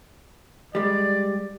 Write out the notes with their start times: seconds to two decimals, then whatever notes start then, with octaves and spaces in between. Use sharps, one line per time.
0.75 G3 G#3 D5